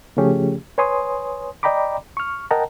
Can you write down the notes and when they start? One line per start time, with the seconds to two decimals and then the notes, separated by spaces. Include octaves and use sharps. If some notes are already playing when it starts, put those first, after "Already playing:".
0.17 C#3 F3 A3 C#4 G4 G#4
0.78 B4 C#5 G#5 C6 D#6
1.63 D5 D#5 G5 A#5 B5 D6
2.17 C#6 F6
2.51 A#4 D#5 F#5 G5 A5 A#5